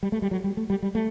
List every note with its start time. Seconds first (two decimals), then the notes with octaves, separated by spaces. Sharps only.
0.03 G3
0.12 A3
0.22 G3
0.31 F#3
0.44 G3
0.57 A3
0.70 G3
0.83 G3
0.95 A3